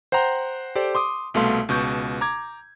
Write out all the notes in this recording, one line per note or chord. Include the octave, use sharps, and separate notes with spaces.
C5 F#5 G5 A#5 C6
G4 A4 C5 D5
C6 D6 D#6
C2 B2 A3 F5 C6
C#2 B2 C#6 G6
A#5 D6 G#6